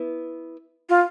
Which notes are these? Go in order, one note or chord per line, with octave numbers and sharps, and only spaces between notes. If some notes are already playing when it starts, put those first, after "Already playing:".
Already playing: B3 E4
F4